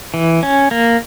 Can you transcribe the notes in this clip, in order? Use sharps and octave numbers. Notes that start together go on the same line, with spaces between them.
E3
C#4
A#3